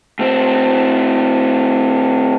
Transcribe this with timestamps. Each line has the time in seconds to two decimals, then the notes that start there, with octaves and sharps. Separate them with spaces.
0.19 A2 C4